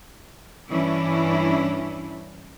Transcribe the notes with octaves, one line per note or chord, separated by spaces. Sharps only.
G2 E3 G3 C#4 D4 E4